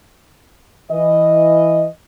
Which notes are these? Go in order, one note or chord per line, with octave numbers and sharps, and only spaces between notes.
E3 D#5